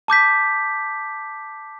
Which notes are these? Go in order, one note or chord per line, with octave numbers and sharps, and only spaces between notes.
A5 D6 G6 B6